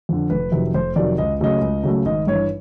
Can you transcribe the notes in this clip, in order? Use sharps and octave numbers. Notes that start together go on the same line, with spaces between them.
F2 D3
F1 B4
F2 C3 D#3 F#3
F1 C5
F2 C3 D#3 F#3 D5
C#2 D#5
C#3 F#3 A3 D#5
C#2
C#3 F#3 A3
G#1 D#5
G2 E3 C#5